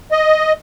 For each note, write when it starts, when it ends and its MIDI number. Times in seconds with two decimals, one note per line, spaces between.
0.12 0.52 75